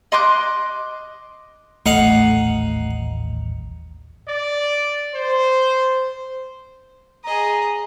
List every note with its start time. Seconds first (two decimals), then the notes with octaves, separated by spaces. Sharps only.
0.12 D#5 C6 D6 F#6
1.86 D#1 A1 A3 D#4 F5 F#5
4.29 D5
5.15 C5
7.24 G#4 D#5 A#5